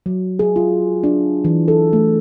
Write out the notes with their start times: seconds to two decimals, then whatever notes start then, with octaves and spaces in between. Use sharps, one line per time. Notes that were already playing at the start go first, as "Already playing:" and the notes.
0.06 F#3
0.39 G#4
0.56 F4
1.04 D4
1.45 E3
1.68 A4
1.93 A3